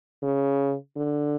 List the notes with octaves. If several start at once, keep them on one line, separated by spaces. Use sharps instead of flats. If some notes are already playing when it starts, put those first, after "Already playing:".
C#3
D3